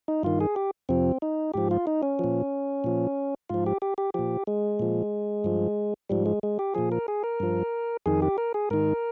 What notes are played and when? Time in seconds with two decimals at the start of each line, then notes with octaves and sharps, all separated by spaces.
0.08 D#4
0.23 G2 D#3 F4
0.41 G#4
0.56 G4
0.89 F2 C3 F3 C4
1.22 D#4
1.54 G#2 F3 G4
1.71 F4
1.87 D#4
2.03 C#4
2.19 A#2 F3
2.84 A#2 F3
3.50 G#2 F3 F4
3.66 G4
3.82 G4
3.98 G4
4.14 A#2 F3 G4
4.47 G#3
4.79 A#2 F3
5.44 G2 F3
6.09 G#2 F3 G3
6.26 G#3
6.43 G#3
6.59 G4
6.75 A#2 F3 G#4
6.92 A#4
7.08 G#4
7.24 A#4
7.40 G2 F3
8.06 F2 D#3 G#4
8.22 G4
8.38 A#4
8.54 G#4
8.70 G#2 D#3 A#4